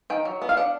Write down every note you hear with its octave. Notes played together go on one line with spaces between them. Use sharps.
D#3 G5
F#3
B3
F5
D4 F#5